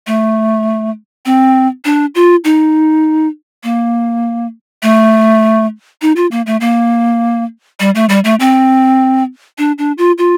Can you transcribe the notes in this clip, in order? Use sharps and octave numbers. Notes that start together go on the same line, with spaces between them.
A3
C4
D4
F4
D#4
A#3
A3
D#4
F4
A#3
A3
A#3
G3
A3
G3
A3
C4
D4
D4
F4
F4